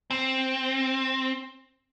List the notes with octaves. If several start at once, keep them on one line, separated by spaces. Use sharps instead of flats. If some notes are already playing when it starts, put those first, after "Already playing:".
C4